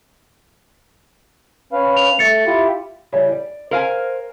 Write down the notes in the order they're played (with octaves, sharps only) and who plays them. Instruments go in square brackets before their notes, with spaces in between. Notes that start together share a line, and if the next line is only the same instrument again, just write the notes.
[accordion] C#4 B4 F5
[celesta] F7
[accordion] A3 [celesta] A6 C#7
[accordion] E4 F4 G4
[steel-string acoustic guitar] C#3 E3 G3
D5
[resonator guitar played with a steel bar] A#4 F5 G#5 [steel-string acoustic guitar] C5